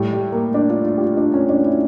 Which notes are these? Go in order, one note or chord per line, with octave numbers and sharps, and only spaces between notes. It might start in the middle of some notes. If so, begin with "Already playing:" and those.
Already playing: A2 G3 A3
G3
A#3
D4
F4
F4
G4
F4
D4
C#4
D4
F4
E4